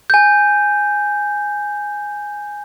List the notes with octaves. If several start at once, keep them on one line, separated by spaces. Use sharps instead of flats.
G#5 G6